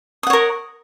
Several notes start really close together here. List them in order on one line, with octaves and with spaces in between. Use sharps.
D#6 F#5 C#5 A#4